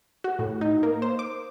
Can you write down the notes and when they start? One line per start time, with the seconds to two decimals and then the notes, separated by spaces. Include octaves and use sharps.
0.24 F#4
0.39 A2
0.61 D#4
0.83 A#3
1.02 C5
1.19 D6